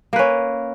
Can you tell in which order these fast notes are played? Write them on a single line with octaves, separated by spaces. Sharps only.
A#3 B4 C#4